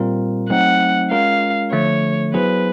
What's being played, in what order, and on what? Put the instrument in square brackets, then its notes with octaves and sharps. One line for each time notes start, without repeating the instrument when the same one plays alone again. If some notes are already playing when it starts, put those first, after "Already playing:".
Already playing: [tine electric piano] A#2 G3 C4 F4 A#4
[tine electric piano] F#3 A3 C4 D#4 [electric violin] F#5
[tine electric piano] G#3 C#4 F4 A#4 [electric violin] F5
[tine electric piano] D3 F3 A3 [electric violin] C#5
[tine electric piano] F#3 B3 E4 G#4 C5 [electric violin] B4